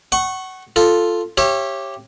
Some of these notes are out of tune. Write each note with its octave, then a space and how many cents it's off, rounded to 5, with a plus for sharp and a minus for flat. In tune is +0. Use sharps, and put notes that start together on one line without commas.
F#5 +25 C#6 -15
F4 +0 A4 +0
G4 +0 C#5 -25 E5 +35